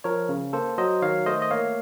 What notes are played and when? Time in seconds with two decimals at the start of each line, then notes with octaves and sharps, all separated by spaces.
0.04 F3 A#4 C#5
0.29 C#3
0.53 A#3 A4 C5
0.78 F#3 C5 D#5
1.02 D#3 C#5 F5
1.26 A3 C5 D#5
1.42 D#5
1.51 A#3 C#5 F5